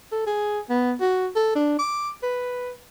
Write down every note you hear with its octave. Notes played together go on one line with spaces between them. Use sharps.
A4
G#4
B3
F#4
A4
D4
D6
B4